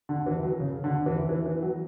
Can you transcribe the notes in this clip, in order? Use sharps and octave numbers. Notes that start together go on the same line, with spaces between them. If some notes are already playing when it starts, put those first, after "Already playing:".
D3
E3
F#3
C#3
D3
E3
E3
E3
F#3